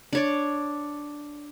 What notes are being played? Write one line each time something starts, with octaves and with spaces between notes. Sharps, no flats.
D4 C#5 D5